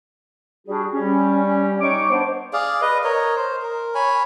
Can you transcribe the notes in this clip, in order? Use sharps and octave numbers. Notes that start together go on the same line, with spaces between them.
G3 D4 F#4 G#4
G3 C#4
D#4 C#5 G5 C#6 D6
B3 D4 C5
G#4 D5 F5
B4 D#5
A#4 C#5 D#5
C5
A#4
C#5 G#5 B5